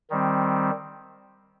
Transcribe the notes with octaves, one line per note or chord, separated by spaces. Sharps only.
D#3 G3 C4